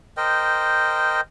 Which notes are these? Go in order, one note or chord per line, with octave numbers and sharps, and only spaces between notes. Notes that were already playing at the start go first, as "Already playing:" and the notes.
A#4 C5 D#5 G5